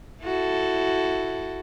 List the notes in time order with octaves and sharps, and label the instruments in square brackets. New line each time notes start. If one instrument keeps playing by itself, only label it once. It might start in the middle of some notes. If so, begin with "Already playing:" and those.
[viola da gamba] E4 F#4 A4